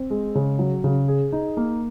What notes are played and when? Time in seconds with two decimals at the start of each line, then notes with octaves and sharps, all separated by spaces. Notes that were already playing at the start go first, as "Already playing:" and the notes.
Already playing: C4
0.10 G#3
0.35 C#3
0.59 F#3
0.84 C#3
1.08 G#4
1.32 D#4
1.57 A#3